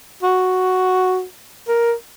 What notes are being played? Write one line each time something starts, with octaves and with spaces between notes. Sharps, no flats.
F#4
A#4